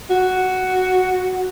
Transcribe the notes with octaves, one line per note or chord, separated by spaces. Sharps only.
F#4